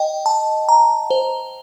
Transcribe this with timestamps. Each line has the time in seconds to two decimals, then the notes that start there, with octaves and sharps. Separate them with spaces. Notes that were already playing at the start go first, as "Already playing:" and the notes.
Already playing: D#5 G5
0.26 A5
0.69 A#5
1.10 C5